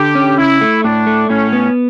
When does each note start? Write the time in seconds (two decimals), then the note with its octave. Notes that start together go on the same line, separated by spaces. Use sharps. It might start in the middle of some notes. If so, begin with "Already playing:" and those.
Already playing: D3 G4
0.15 C#4
0.38 C#3 E4
0.61 A3
0.84 A2 D4
1.07 A3
1.30 A2 C#4
1.53 B3